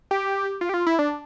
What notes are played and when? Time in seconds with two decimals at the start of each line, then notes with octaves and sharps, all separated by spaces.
0.11 G4
0.61 F4
0.69 G4
0.74 F4
0.86 E4
0.99 D4